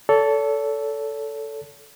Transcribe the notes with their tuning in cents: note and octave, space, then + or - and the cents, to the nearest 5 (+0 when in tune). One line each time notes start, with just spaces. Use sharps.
A4 +0 C#5 +45